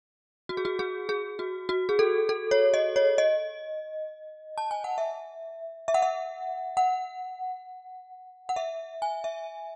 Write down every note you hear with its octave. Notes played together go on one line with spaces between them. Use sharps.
F#4
G#4
F#4
G#4
G#4
F#4
F#4
G#4
A4
A4
C#5
D#5
C#5
D#5
A5
G#5
F#5
E5
E5
F#5
E5
F#5
F#5
E5
G#5
E5